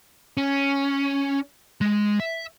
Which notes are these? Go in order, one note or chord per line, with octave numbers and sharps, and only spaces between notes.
C#4
G#3
E5